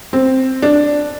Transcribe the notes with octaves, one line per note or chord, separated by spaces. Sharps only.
C4
D4